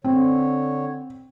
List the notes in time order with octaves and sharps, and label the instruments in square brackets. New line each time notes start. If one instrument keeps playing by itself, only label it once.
[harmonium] D3 C#5 [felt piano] C4